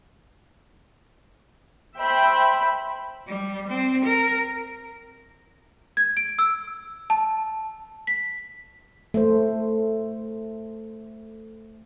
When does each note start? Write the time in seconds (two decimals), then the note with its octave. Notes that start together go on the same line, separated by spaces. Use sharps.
1.97 C5 E5 G5 B5
3.27 G3
3.68 C4
4.05 A#4
5.97 G#6
6.17 D7
6.39 E6
7.10 A5
8.07 B6
9.14 A3 C5